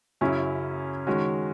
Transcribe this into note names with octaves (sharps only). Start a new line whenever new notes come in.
F#2 C#3 F#3 C#4 E4
D#3 G#3 C#4 F#4